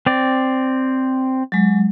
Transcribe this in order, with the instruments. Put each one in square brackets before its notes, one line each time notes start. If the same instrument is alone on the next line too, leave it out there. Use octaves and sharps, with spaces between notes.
[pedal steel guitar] C4 D5
[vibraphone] F#3 G#3